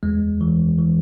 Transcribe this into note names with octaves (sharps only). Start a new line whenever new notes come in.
E2 G#3
E3
E3